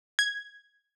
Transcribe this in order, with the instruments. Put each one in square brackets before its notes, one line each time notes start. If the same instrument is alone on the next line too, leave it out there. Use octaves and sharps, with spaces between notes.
[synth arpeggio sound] G#6